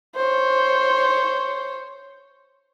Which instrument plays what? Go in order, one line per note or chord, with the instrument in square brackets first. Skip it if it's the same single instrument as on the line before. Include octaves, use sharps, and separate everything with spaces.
[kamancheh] C5 C#5